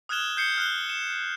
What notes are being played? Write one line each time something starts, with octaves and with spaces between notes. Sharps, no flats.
D#6 F6 F#6 G#6 E7 G7
G6 C7 C#7 G7
F6 F#6 G7
E7